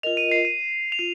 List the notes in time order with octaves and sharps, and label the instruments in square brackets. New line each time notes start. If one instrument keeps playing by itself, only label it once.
[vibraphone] F4 A#4 D#5 [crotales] F7
[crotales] D#7
C7
D#7
F7
[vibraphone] F4 [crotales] D#7